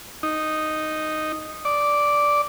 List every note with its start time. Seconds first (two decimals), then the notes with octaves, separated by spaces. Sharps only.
0.23 D#4
1.65 D5